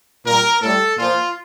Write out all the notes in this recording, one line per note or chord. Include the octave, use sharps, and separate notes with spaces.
A#2 G3 A#4
A2 G3 A4
A#2 F3 F4